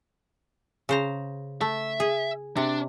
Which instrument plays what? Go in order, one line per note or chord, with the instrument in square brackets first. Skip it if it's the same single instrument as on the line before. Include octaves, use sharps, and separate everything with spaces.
[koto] C#3 C5 A#5
[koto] A3 [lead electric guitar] E5
[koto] G#4
[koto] C3 [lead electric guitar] D4